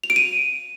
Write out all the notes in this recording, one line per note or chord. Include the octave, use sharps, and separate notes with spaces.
F7
D7
D#7